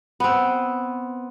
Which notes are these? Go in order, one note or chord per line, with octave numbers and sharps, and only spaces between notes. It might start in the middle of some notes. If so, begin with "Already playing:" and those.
B3 C4